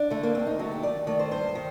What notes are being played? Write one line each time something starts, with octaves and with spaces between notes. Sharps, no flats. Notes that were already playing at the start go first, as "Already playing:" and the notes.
Already playing: D4
D3 A3
A#3
D2 C4
D#4
D3 F#3 A3 F#4
G4
D#2 D5
D#3 A3 D5
C5
G2 C5
D#3